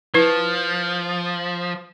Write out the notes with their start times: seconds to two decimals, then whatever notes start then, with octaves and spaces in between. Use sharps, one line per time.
0.14 F3 E4 B4